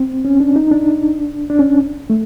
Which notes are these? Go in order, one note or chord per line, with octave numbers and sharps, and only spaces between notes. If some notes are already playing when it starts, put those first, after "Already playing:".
Already playing: C4
C#4
D4
D#4
D4
D4
C#4
A3